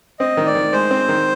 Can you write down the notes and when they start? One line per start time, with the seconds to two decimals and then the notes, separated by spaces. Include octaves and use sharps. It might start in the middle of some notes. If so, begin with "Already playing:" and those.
0.19 C4 D#5
0.37 D#3
0.46 D5
0.55 D#3
0.73 G#3 C5
0.91 C4
1.09 D#3